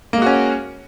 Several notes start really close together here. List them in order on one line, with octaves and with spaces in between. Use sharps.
A#3 G#3 F#4 C#4